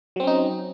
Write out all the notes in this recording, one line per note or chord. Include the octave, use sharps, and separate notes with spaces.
F#3 C4 C#4 D#4